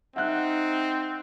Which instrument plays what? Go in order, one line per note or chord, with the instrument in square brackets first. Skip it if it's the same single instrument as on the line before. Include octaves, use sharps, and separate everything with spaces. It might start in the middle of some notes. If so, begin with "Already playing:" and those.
[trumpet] C4 [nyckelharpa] D#4 [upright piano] E5 F6 F#6 [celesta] F#5